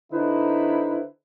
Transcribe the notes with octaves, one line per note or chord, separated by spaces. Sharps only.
D3 D#4 E4 B4 C5